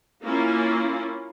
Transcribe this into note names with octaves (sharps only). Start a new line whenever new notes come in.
A#3 C#4 E4 F4